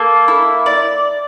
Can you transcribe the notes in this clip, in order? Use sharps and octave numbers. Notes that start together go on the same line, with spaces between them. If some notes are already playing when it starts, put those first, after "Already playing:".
Already playing: A#3 A4
E4
D5